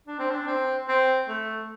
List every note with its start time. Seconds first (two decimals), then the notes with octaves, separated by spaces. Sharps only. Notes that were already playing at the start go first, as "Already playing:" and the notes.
0.08 D4
0.19 C4
0.31 D4
0.47 C4
0.88 C4
1.28 A3